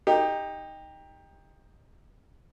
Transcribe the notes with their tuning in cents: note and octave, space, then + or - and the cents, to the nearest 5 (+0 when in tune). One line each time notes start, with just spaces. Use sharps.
D#4 +0 G4 +20